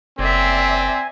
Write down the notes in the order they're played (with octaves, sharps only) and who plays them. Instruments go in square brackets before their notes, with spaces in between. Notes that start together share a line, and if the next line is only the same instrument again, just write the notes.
[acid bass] F#1 [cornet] C4 [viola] D5 E5 [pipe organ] G#5